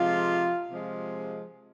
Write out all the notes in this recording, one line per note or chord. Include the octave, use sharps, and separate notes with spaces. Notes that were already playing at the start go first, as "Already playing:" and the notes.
Already playing: C3 F3 G#3 F4
C3 F3 G#3